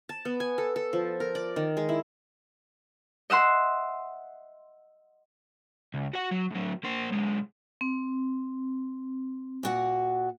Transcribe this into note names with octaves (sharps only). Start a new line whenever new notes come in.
A5
B3
G#5
A4
A4
F3
A#4
D5
D#3
G#3
E4
D#5 E5 F#5 C6
C#2
F#4 F#5
F#3
A2 F#3
A#3 C5
B1 G#3
C4
A#2 F#4 F#5